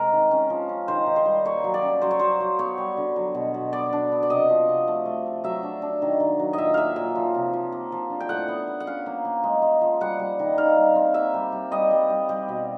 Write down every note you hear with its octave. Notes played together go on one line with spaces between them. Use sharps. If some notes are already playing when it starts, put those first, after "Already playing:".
Already playing: C3 G#3 A#4
D#3
C#4
F3
C#4
D#3 C5
D#3
C5
G3
A#3 C#5
F#3
D5
C#4
F#3 C5
C#5
F#3 C5
F#3
B3 C#5
G3
D3
F#3
B2
B2
B3 D5
D4
B3
D5
C3 D#5
F3
C3
A3
A3
A3
F#3 E5
D4
D4
D#3
D#3
F#3
A#2 D#5 E5
A#3 E5 F5
A#2
F3
C3
F3
A#3
F3
D4
G5
A2 F#5
B3
B3
F#5
C#4 F5
A#3
A#3
G#3
G#3
F3
G3 F#5
G3
D#3
D#3 F5
G3
C4
A#3 E5
G3
G3
G3 D#5
G3
G3
G3
B2